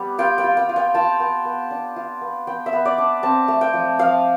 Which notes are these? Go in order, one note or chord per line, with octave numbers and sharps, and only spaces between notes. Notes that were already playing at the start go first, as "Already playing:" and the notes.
Already playing: G3 B3
F4 G5
G5
F4
G5
F4
G5
F4 A5
B3
B3
D4
F4
B3
B3 G5
E5
B3
D5
D4
C4 A5
A3
G5
F3
F3 F5